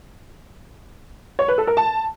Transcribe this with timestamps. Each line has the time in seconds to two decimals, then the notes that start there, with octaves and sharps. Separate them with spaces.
1.39 C#5
1.48 B4
1.58 A4
1.67 A#4
1.77 A5